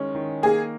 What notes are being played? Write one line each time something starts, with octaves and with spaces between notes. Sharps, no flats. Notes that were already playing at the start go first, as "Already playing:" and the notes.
Already playing: D#3 G#3 C#4
D#3
A#3 G#4